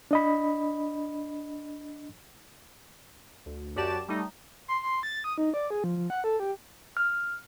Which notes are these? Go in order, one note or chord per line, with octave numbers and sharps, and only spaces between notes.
D4 D#5 B5
D2
F#2 F#4 G4 D5 A5 E7
G3 A3 D#4
C6
C6
A6
D#6
D#4
D5
G#4
F3
F3
F#5
A4
G4
F6